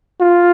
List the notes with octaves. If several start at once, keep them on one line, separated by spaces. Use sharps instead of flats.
F4